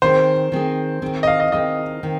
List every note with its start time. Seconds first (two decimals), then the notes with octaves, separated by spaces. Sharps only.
0.02 D#3 C4 G#4 C5
0.52 D#3 C4 G#4
1.02 D#3 C4 G#4
1.23 D#5
1.27 F5
1.40 D#5
1.52 D#3 C4 G#4 D#5
2.03 D#3 C4